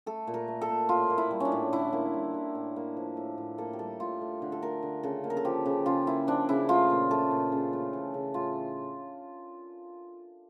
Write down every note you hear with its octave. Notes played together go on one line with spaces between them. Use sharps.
A3 A4
A#2
A#4
A3
A4
A#2
A2 F4
A#3
E4
G3
C#4 D4
A2
D3 E4
A#3
G3
D3
A2
A#3
F3
A2
A2
A#3 A4
G4
G3 A4
A2 F4
A3
D3
A4
A3 A#4
D3
C#3 A4
A#3
A#4
A4
F3 G4
C#3
C#3 F4
A#3 E4
F3 D4
C#3 E4
A3 F4
A#2
A3 A4
A#2
C#3
A3
E3
C#3
A2 F4